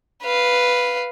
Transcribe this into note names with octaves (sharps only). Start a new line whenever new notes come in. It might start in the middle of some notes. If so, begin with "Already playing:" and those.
B4 F5